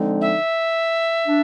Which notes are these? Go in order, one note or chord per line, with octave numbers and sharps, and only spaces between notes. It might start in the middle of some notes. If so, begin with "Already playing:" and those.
Already playing: D3 F3 G#3 C4 D#4
E5
D4